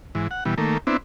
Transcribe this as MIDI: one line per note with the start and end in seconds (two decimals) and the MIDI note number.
0.15 0.28 44
0.15 0.28 52
0.31 0.44 78
0.45 0.55 47
0.45 0.55 52
0.45 0.55 55
0.58 0.78 51
0.58 0.78 57
0.58 0.78 58
0.87 0.97 59
0.87 0.97 60
0.87 0.97 62
0.87 0.97 64